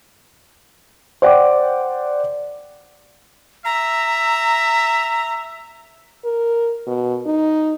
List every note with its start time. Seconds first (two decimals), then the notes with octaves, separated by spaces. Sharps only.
1.22 C5 D5 F#5 G5 D6
3.65 E5 A#5
6.25 A#4
6.87 B2
7.26 D#4